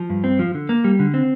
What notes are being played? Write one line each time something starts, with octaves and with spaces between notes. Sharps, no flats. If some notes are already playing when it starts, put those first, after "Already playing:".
Already playing: F3
G2
C4
F3
D3
A#3
G3
D3
C4